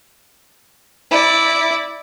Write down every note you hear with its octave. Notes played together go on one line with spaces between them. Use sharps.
E4 D5